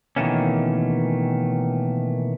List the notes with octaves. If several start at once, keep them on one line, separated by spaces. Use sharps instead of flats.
B2 D#3 E3 A3 A#3 C#4